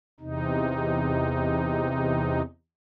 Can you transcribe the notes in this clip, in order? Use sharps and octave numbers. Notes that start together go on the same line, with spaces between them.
E2 C3 D#4